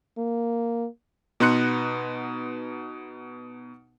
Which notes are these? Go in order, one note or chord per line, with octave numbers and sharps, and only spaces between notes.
A#3
B2 B3 D#4 C6 F#6 C#7